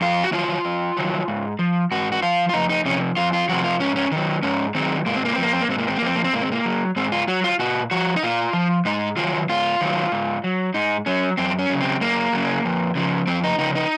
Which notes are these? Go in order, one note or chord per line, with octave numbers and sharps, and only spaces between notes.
F2 F4
F#4
D#3 F#3 F4
F2
D#3 F#3
G#2
F3
G#2 F#4
F#4
F3 F4
F4
F2 D#4
D#4
C3 F3 C#4
F2 F4
F4
C3 F3 F#4
F4
G#2 C#4
C#4
D#3 F#3
G#2 C#4
D#3 F#3 C4
G#2 A#3
C4
A#3
C4
F3 A#3
C4
A#3
G#2 C4
A#3
C4
A#3
F3 C4
A#3
C4
G#2 A#3
C4
A#3
F#3
G#2 C4
F4
F#3 F#4
F4
A#2 F#4
F3 F#4
D#4
A#2 F4
F3
G#2 D#4
D#3 F#3 F4
G#2 F4
D#3 F#3
G#2
F#3
G#2 D#4
F#3 C#4
F#2 C4
C#4
C#3 F#3
C4
F#2 A#3
C#3 F#3
F2
C#3 F3
F2 C4
D#4
C#3 F3 D#4
D#4